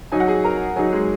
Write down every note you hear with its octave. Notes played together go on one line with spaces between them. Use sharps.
F#3 D#4 G#5
F#5
G#4 G#5
A#4 A#5
F#3 D#4 G#4 G#5
G#3 G#4